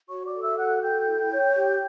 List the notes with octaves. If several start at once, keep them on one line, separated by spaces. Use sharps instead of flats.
F#4 C#5 C#6
D5 D6
A4
E5 E6
F#4 F#5 F#6
A4 G5 G6
E4
C#5
G4